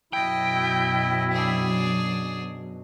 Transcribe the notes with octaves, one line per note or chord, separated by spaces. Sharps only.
F#2 B2 F#3 E4 D#5 G5
D4 G#4